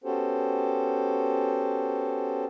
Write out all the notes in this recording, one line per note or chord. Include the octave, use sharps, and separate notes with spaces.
B3 C#4 F#4 G4 A4 C5